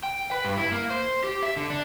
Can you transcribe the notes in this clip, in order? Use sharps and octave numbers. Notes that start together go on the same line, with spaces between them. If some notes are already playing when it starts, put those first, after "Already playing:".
G5
B4
G2
E4
A#3
C5
G4
E5
D3
D4